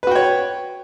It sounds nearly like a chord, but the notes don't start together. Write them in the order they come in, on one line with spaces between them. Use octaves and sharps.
B4 F#4 G5 C#5